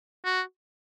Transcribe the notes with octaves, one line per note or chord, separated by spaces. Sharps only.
F#4